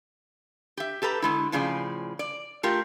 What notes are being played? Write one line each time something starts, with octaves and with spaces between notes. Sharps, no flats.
G4 E5
G4 A4 B4 A#5
D3 G#3 E4
A2 C#3 F3 G#4 D5
D5
A3 F4 G4 A#4